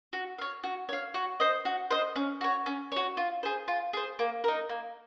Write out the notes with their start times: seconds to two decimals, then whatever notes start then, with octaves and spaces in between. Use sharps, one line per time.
0.13 F#4
0.38 C#5 F5
0.64 F#4
0.89 C#5 F5
1.14 F#4
1.40 C5 D#5
1.65 F#4
1.91 C5 D#5
2.16 C#4
2.41 F#4 C#5
2.66 C#4
2.92 F#4 C#5
3.17 F4
3.43 G#4 C5
3.68 F4
3.93 G#4 C5
4.19 A#3
4.44 D#4 A#4
4.69 A#3